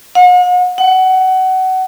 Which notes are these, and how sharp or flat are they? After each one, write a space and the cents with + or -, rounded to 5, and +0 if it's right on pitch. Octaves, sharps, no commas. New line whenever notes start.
F#5 -45
F#5 +25